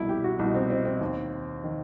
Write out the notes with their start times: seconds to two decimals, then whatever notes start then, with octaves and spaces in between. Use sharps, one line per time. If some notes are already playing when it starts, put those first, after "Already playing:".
Already playing: C2 B2 E4
0.09 G4
0.24 F#4
0.39 C2 B2 D#4
0.55 C4
0.70 C4
0.85 C4
1.01 D#2 D#3
1.64 D#3